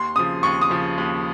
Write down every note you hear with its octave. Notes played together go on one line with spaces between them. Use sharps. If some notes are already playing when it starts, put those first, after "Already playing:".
Already playing: D#2 C6
C#3 F3 D#6
D#2 C#6
D#6
C#3 F3
D#2